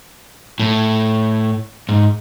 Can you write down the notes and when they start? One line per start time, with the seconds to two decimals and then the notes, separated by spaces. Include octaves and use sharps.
0.59 A2
1.89 G#2